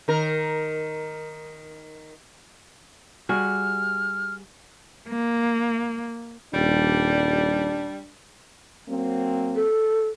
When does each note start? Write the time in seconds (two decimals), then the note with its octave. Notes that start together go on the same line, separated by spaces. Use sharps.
0.08 D#3 A#4
3.29 G3 F#4 G#4 F6
5.09 A#3
6.54 D#1 G3 D4
8.88 F#3 A#3 C4
9.55 A4